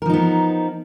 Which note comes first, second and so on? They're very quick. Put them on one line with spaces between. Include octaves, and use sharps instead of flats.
A#4 F3 D#4 B3